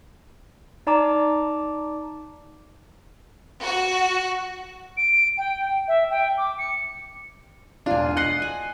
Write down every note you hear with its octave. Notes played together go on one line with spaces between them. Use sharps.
D#4 D5 A5 A#5 D6
F#4
D7
G5
E5
G5
D6
C#7
E1 D4 F4 G#5
D#5 F#5 F#6 C7
G#5